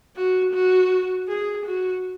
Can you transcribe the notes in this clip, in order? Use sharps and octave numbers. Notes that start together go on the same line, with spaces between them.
F#4
F#4
G#4
F#4